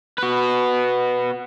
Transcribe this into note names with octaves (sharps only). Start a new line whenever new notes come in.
F#4 B4